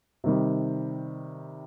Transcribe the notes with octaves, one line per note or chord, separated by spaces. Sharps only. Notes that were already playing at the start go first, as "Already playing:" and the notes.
C3 D#3 G3